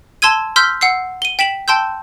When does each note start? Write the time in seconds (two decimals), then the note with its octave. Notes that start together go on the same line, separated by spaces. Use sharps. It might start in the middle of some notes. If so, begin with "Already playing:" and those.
0.22 A5 C6 E6 G#6 D#7
0.56 C6 E6 F6 G6 B6
0.81 F#5 E6 C7
1.22 D#7 G7
1.39 G5 B6 E7 F#7
1.68 G5 A5 C6 E6 G6